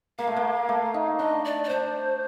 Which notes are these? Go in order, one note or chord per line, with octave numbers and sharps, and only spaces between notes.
A#3 F5
A3
A#3
A3
D#4
D4 D#5
D5
D5
D4 C5